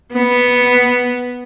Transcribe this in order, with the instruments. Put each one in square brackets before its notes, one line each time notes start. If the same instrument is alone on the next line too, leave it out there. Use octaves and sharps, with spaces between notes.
[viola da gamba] B3